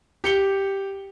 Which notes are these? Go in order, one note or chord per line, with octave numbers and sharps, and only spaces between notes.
G4 C#7 G7